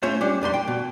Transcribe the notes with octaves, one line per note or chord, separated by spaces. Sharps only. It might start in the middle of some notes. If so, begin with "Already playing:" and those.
A3 C#4 F4 G#4 C5 C#5
G3 C#4 D4
F2 G3 B5 C6
G5
B2